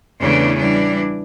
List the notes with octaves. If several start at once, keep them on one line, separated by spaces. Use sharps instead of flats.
E2 C#3 E3 A3 D4
E3 G3 D4